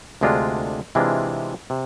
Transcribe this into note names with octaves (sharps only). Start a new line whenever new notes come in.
D2 C3 G#3 D4 F4
C3 E3 G#3 D4 F4
C3